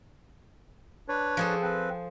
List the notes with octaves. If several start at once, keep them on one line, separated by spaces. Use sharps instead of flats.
D4 B4 C#5
F3 G#4 A4
C4 B4